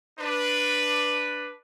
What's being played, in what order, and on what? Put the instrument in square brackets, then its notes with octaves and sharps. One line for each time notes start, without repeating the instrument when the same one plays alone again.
[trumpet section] D4 B4